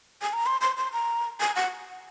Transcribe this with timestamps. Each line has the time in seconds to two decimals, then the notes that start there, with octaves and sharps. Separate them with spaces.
0.22 G#5
0.33 A#5
0.46 C6
0.61 C6
0.77 C6
0.93 A#5
1.40 G#5
1.56 F#5